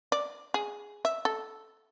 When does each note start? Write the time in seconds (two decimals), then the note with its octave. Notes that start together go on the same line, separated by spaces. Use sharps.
0.12 D5
0.54 G#4
1.05 E5
1.25 A4